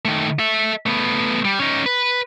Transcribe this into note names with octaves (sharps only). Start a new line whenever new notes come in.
D#3 A3
A4 E5
A3 B3
G3
C#4 D#4
B4